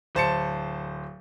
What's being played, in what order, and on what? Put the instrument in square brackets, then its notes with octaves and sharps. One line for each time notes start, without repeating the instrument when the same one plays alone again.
[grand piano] D1 C5 A5 C#7